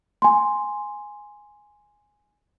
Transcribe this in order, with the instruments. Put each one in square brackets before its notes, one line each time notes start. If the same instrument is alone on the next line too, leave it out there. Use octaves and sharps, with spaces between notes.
[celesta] G#5 C6